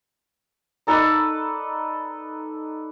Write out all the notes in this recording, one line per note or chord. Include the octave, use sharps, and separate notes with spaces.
D#4 A4 B4 D5